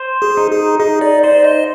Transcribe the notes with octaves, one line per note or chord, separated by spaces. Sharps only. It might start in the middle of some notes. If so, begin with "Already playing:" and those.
Already playing: C5
G#4
D#4
G#4
D#4 G#4
D5
C5 D5
D#5